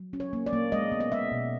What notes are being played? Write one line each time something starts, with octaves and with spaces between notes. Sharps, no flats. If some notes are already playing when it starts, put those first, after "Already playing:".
Already playing: F#3
C#4
C#5
A#3
D5
A#3
G#3 D#5
B3
D#5
G#3 E5
B2